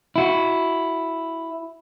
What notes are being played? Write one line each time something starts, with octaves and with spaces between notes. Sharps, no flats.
E4 F#4